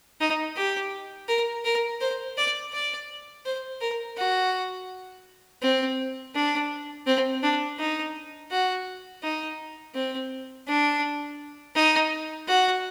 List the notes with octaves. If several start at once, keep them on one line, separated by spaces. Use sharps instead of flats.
D#4
G4
A#4
A#4
C5
D5
D5
C5
A#4
F#4
C4
D4
C4
D4
D#4
F#4
D#4
C4
D4
D#4
F#4